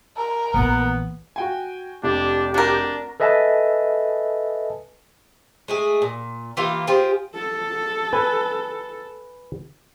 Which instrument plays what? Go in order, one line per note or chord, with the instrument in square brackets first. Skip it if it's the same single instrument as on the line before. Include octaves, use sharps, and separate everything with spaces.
[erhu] A#4
[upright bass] A#1 E3 [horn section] B3
[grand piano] F#4 G5 G#5
[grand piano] F1 [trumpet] D4 [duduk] G4
[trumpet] D4 [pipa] F#4 A#4
[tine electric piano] A4 B4 D#5 E5 G#5 A5
[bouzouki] G#3 A3 G#4
A#2
E3 A#3 F4 G4
F4 G4 G#4 C5
[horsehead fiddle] A4
[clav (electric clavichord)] B4 G#5